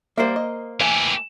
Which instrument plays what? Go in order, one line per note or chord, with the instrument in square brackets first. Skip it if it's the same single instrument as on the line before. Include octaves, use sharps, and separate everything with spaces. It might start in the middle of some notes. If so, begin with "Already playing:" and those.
[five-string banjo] G3 E5 [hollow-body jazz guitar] A#3 A#4 C5
[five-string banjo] D#5
[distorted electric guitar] E3 G4 [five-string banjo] A3 G#5